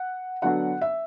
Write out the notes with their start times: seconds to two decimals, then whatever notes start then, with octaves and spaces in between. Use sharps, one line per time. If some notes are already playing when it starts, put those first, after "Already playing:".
Already playing: F#5
0.42 D3 F#3 B3 D4 F#4 F#5
0.81 E5